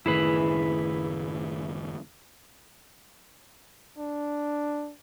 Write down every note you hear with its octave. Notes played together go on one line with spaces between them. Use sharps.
F#1 A2 D#3 E4 G#4 B4
D4